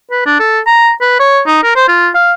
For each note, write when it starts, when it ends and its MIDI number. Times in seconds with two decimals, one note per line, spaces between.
0.11 0.24 71
0.26 0.39 62
0.39 0.59 69
0.66 0.91 82
1.01 1.19 71
1.20 1.41 73
1.47 1.59 63
1.63 1.75 70
1.76 1.87 72
1.88 2.09 65
2.15 2.33 77